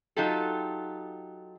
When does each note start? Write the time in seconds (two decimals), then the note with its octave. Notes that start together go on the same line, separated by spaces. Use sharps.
0.16 F#3 D#4 F4 G4 A4